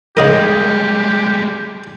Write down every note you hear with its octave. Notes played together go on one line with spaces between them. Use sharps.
C#3 G3 G#3 D#4 G4 A#4